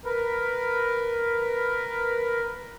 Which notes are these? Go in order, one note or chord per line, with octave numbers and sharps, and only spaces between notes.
A#4 B4